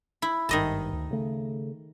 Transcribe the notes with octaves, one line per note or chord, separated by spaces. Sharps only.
E4
G#1 G2 D#3 D#5 A5
D2
C#3 A3